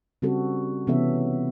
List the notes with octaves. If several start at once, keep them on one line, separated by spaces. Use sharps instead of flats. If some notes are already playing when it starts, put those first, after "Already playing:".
C#3 G3 C4 F#4 A4
C3 E3 B3 C#4 A4 E5